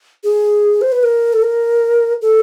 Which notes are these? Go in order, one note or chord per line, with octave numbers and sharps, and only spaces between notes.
G#4
C5
B4
A#4
A4
A#4
A4